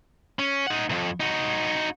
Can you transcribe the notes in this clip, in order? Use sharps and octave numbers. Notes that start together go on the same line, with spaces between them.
C#4
D#4 F#5
B1 F2
D#4 F#4